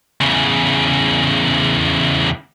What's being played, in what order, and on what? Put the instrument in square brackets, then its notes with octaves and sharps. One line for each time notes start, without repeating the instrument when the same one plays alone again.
[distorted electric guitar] E2 C#3